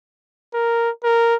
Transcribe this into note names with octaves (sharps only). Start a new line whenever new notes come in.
A#4
A#4